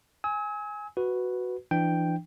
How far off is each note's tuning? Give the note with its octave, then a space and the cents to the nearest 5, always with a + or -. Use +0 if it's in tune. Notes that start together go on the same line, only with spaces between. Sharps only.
G#5 +0 E6 -45
F#4 +0 B4 +0
E3 +30 D4 +25 G5 +0